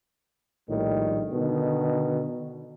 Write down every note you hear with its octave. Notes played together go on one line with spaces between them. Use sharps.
A#1 A2 D#3 G3
B2 D3 D#3